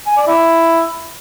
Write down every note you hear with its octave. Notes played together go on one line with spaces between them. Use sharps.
G#5
D5
E4